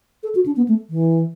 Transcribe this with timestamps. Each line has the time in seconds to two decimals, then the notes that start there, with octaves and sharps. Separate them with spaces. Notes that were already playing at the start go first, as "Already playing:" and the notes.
0.23 A4
0.35 F#4
0.46 D4
0.56 B3
0.68 A3
0.90 E3